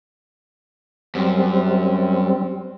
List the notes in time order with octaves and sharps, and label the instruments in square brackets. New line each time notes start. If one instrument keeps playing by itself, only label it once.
[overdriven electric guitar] F#2 [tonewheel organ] G3 C4